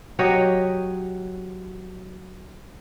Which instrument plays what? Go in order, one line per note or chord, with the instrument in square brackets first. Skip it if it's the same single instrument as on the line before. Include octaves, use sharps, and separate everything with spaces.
[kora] F#3 G4 C#5 D#5